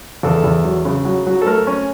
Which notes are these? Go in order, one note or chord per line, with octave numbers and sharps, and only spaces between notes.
E2 A4
E2
F#3
C#3
F#3
F#3
A4
A3 A#4
C#4